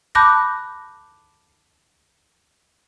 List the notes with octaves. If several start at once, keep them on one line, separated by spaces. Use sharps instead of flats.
A5 B5 D6 F#6 G6 A#6